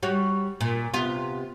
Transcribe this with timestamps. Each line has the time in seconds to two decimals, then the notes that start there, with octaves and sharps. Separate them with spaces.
0.03 G3 F#4 C#5
0.61 A#2
0.94 C3 B3 F4